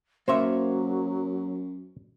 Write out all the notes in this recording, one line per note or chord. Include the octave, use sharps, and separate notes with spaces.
F#2 F#3 A#3 C5 C#5 E5